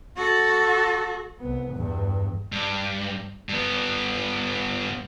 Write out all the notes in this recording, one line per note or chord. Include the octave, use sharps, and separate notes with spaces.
F#4 A4
C2 B3
E2 G2
G2
G2 B3